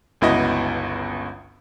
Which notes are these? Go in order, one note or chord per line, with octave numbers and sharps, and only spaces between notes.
G1 C#2 B3 E4 F#4 D#5